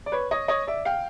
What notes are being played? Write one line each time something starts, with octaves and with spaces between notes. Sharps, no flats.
D5
B4 C#5
C#5 D#5
C#5 D#5
D5 E5
F5 G5